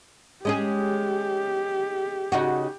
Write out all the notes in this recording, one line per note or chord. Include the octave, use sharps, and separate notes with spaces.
G#3 C#4 G4 G#4
C#3 D#4 F#4